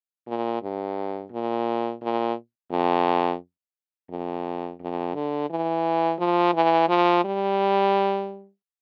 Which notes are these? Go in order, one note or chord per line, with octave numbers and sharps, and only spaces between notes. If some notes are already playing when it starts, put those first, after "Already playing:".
A#2
G2
A#2
A#2
F2
F2
F2
D3
E3
F3
E3
F3
G3